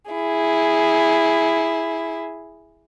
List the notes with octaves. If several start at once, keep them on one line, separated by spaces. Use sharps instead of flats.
E4 G#4